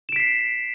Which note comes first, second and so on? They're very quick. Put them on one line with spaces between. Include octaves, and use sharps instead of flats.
E7 D7 B6 C7